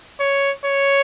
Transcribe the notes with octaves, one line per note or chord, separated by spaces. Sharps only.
C#5
C#5